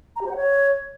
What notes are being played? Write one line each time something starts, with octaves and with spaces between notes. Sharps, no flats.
A#5
G4
C5
F#5
C#5